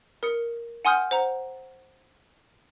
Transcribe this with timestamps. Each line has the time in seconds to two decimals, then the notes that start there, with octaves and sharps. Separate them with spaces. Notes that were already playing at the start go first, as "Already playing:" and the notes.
0.23 A#4 D#6 C#7
0.85 F#5 G#5 C6 D#6 F6 G6
1.11 C5 F#5 A#5